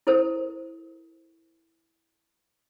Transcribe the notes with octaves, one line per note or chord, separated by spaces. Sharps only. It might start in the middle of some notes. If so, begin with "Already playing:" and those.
E4 A4 A#4 C5